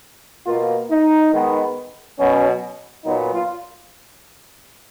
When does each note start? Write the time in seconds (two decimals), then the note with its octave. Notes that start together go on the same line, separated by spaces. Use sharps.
0.46 B2 A#3 F4
0.90 D#4
1.33 D#3 G#3 B3
2.19 B2 F#3 B3 C#4
3.05 A#2 F#3 B3 D#4
3.34 F4